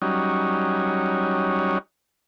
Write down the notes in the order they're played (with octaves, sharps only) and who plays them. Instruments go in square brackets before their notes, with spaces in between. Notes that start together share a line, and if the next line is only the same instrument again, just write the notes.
[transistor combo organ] F#3 G3 C#4 D#4